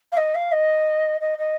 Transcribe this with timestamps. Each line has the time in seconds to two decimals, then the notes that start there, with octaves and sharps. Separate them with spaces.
0.12 F5
0.17 D#5
0.34 F5
0.52 D#5
1.20 D#5
1.38 D#5